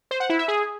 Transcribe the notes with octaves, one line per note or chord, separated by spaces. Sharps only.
C5
F#5
E4
E5
G#4